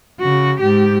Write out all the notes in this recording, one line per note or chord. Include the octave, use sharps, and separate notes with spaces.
C#3 F#4
G#2 G4